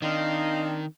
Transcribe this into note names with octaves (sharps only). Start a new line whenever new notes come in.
D#3 C4 D4 D#4 D#5 F5